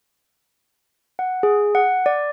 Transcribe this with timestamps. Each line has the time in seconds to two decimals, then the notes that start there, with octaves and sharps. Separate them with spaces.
1.19 F#5
1.43 G#4
1.75 F#5
2.06 D5